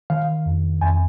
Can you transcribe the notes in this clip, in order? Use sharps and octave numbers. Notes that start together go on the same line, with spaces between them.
D#3 F5
F2
F2 G#5